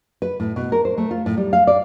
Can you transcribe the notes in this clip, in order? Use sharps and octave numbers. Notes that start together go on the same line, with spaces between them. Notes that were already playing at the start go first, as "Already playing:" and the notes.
B4
A2
B2
A#4
C5
A3
F4
A2
G3
F5
D5